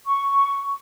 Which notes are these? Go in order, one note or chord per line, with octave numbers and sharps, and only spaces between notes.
C#6